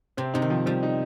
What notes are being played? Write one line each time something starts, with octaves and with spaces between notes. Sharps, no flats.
C3 C4
C3 D#4
D#3
F3
F3 G3
D#4